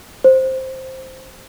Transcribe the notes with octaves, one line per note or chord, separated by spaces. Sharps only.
C5